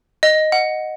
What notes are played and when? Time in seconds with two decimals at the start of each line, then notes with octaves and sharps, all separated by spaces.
0.23 D#5
0.52 F#5